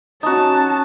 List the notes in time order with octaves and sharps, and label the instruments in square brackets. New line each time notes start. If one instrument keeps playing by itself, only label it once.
[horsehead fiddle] C#4 A5 [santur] D#4 F#4